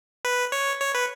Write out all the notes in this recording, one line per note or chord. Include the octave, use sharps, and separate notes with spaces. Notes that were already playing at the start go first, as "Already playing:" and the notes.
B4
C#5
C#5
B4